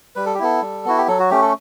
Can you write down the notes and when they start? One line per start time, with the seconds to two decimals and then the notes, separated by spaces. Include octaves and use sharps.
0.16 G3 B4
0.26 A4
0.34 G4
0.39 B3 E4 A4
0.62 G3
0.85 B3 E4 F#4
0.97 G4
1.08 F#3 A4
1.19 F#4
1.31 A3 C#4 G4
1.42 A4